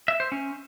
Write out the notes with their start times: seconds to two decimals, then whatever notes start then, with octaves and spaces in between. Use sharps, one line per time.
0.08 E5
0.20 C5
0.32 C#4